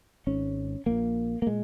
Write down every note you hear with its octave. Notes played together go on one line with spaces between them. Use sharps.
G#1 G#2 C#4
A#1 A#2 A#3
A#3
A#2 G#3